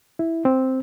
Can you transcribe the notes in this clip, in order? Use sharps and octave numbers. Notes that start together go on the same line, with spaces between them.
E4
C4